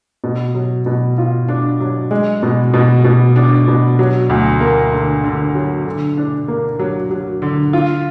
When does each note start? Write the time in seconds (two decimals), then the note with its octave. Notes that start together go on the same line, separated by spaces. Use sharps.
0.24 B2
0.55 F#3
0.86 B2
1.18 F4
1.49 D4
1.80 F#3
2.11 G#3
2.43 B2
2.74 B2
3.04 B2
3.36 D4
3.68 B2
3.99 F#3
4.30 D2
4.61 A#3
4.92 D3
5.24 D3
5.55 F#3
5.86 D3
6.17 D4
6.48 A#3
6.79 F#3
7.11 F#3
7.42 D3
7.73 F4